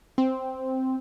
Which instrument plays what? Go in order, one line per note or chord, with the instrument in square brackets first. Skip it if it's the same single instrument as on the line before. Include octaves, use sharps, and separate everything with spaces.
[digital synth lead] C4